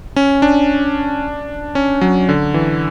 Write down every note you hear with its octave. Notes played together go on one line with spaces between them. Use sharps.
C#4
D4
C#4
F#3
D3
E3